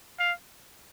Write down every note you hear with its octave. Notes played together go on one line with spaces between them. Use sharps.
F5